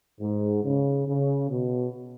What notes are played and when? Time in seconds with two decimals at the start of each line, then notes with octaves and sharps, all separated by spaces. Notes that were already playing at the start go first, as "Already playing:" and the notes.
0.21 G#2
0.64 C#3
1.07 C#3
1.50 B2